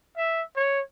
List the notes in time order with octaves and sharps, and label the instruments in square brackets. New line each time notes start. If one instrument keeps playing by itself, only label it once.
[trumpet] E5
C#5